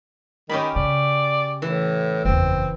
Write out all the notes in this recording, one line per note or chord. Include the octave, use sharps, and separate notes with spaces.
D#3 C#4 G4 B5
C#3 D5
A2 E3
F#1 E2 C4